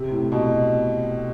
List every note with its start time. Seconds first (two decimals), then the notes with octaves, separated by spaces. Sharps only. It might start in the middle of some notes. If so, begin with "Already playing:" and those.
Already playing: C3
0.11 A2
0.32 B2